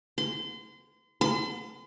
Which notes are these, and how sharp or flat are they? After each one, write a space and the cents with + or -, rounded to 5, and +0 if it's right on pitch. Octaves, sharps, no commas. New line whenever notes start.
C6 -35
C6 -45